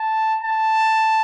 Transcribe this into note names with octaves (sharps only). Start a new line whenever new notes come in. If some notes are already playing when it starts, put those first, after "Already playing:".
Already playing: A5
A5